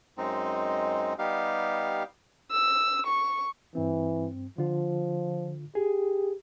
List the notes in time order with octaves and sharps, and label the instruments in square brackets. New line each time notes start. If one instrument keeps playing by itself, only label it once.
[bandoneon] F#2 G#3 C4 D#4
G3 B3 D#4 G4 F5
[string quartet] E6
C#6
[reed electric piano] G2 C4 [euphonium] E3
[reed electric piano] D3 F4 [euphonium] F3
[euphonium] G4 [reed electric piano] G#4